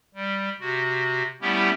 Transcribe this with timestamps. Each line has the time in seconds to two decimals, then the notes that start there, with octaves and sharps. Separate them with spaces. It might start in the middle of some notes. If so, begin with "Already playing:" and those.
0.15 G3
0.61 C3 F#4
1.42 G3 A3 B3 C#4 E4 G4